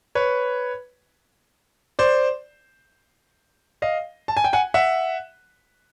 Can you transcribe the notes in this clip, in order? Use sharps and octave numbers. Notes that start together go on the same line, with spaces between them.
B4 C#5
C5 D5
D#5 F5
A5
G#5
G5
F#5 G#5
E5 F#5